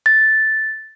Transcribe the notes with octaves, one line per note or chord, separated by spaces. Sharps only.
A6